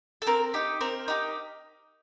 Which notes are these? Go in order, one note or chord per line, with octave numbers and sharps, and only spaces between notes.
A4
C4 A#4
D#4 G4
C4 A#4
D#4 G4